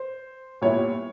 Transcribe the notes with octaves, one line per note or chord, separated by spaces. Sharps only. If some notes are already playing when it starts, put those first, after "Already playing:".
Already playing: C5
A#2 G3 B3 E4 C#5